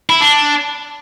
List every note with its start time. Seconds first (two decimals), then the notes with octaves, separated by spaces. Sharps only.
0.10 E4
0.21 D4